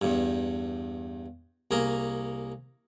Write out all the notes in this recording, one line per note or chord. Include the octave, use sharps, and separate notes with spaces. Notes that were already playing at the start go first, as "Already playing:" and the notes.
E2 G2
C2 A#3 G#4 A#4